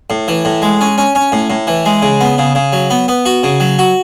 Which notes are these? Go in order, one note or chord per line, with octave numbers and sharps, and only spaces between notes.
A2
E3
A2
G#3
C#4
C#4
C#4
A2
A2
E3
G#3
C#3
B3
C#3
C#3
F#3
B3
B3
F#4
C#3
F#3
F#4